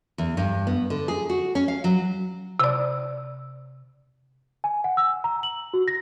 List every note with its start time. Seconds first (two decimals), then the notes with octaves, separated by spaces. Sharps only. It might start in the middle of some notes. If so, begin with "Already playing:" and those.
0.18 E2
0.37 G2
0.67 B3
0.90 D3
1.08 G#4
1.30 F#4
1.55 C#4
1.68 F5
1.84 F#3
2.60 C3 D5
4.64 G#5
4.84 F#5
4.97 E6
5.24 A#5
5.43 F#7
5.74 F#4
5.88 A#6